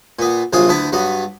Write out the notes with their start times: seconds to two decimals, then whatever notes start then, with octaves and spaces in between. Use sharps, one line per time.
0.19 A#2 B3
0.53 A#1 C3 F#3 F4 G#4
0.69 D2 B3 E4 A5
0.92 G2 F#3 B3